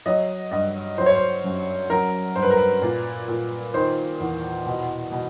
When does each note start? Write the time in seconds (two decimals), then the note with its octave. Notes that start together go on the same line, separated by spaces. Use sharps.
0.06 F#3 D#5
0.52 G2 D#5
0.98 F#3 C5
1.06 C#5
1.15 C5
1.44 F#2
1.90 F#3 A#4
2.36 G2 C5
2.43 B4
2.50 A#4
2.57 B4
2.82 A#2
3.28 A#2
3.74 D#3 C5
4.20 E2
4.66 B2
5.12 B2